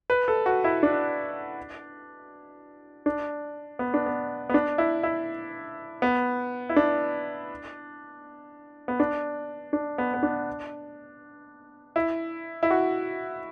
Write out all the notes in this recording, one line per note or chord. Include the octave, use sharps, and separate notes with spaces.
B4
A4
F#4
E4
D4
D4
B3
D4
B3
B3
D4
E4
E4
B3
E4
D4
B3
D4
D4
B3
B3
D4
E4
E4
F#4